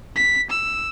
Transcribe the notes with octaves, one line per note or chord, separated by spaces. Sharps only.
B6
E6